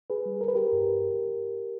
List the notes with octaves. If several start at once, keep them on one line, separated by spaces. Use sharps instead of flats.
G#4 B4
G3
A#4
B4
G4 A#4
G2